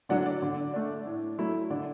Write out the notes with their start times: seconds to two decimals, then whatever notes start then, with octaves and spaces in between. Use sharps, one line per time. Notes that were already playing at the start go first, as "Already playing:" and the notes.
0.09 D3 F#3 D4 D5 F#5
0.26 D5
0.42 D3
0.74 A3 D4
1.06 A2
1.38 F#3 A3 E4
1.70 D3 D5